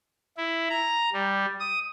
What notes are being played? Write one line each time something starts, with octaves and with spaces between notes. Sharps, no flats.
E4
A#5
G3
D#6